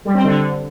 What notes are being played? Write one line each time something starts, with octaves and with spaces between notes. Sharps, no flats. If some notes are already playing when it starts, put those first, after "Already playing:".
G3
C4
D3